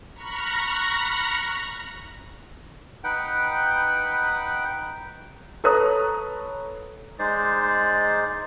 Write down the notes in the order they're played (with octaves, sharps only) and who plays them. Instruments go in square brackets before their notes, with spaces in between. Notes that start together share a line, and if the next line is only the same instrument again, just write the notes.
[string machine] A#5 B5 C#6 F6 F#6 A#6
[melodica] D#4 B4 F#5 G5
[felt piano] A4 B4 C#5 A#5 D#6 F#6
[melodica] G#3 D#4 C5 D5